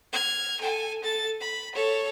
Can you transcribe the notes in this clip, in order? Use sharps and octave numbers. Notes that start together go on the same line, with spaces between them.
F6 G#6
A4 G#5
A4 A6
B5
A4 C#5